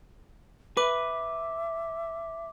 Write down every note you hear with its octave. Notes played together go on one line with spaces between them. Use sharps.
B4 E5 D6